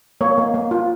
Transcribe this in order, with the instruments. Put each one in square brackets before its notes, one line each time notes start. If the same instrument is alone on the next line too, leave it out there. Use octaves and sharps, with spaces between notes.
[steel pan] A#3 C#5
A#3
A#3
F4